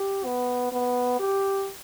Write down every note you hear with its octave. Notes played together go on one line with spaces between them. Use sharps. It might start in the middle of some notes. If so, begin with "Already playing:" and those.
Already playing: G4
B3
B3
G4